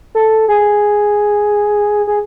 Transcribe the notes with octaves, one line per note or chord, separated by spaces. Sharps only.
A4
G#4
G#4